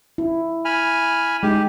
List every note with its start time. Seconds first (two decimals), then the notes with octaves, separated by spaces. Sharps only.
0.18 E4
0.65 G#5 B5 F6
1.43 G#3 D#4 G4